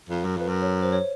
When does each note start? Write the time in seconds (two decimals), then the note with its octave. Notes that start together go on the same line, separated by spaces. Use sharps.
0.09 F2
0.24 F#2
0.37 F2 B4
0.48 F#2
0.62 C#5
0.82 C5
0.92 C#5